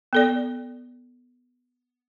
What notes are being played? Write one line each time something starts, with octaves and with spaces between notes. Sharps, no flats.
B3 A4 D5